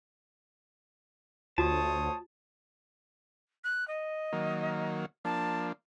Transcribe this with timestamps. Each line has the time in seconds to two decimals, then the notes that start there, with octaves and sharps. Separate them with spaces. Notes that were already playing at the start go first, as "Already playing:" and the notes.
1.58 D2 F4 F#4 C5 C#5 A5 D#6
3.64 F#6
3.87 D#5
4.33 D#3 F#3 A#3
5.25 F3 A#3 D4 A5